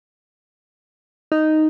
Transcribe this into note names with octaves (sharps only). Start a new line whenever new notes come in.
D#4